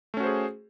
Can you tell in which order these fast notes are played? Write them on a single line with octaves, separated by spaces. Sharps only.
A3 C#4 F#4 C5 G#4